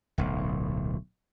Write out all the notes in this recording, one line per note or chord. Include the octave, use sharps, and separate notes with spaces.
D1 B1